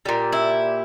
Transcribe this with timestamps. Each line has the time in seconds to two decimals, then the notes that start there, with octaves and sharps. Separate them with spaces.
0.06 A#2 G3
0.33 E4